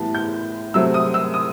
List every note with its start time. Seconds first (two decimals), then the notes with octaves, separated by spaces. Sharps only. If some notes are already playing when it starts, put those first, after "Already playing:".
Already playing: A2 E3 G3 B3 A5
0.15 G6
0.74 C3 F#3 A3 C4 E6
0.94 D#6
1.14 E6
1.34 D#6